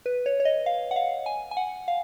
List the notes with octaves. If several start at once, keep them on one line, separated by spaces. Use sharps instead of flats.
B4
C#5
C#5
D#5
F5
F#5
F5
G#5
G#5
F#5
F5